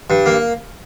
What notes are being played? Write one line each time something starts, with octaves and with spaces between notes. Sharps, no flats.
G2
A#3